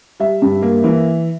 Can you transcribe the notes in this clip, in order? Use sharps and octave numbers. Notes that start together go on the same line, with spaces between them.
G3 E5
G2
A#3
E3